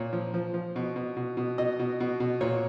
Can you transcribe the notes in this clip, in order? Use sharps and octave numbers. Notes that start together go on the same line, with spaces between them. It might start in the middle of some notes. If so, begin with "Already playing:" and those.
Already playing: A#2 C#5
F3
F3
F3
B2
B2
B2
B2
B2 D#5
B2
B2
B2
A#2 C#5